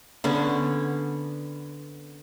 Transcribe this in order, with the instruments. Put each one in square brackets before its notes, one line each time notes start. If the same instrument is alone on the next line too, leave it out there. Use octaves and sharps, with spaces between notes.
[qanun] D3 B3 C#4